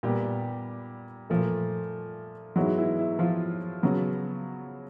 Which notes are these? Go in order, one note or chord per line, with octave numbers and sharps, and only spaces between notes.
A#2 G3 B3 G4
A#2 F3 A3
G#2 E3 F#3 G#3 B3 F#4
E4
E4
F3 F4
C#3 F#3 B3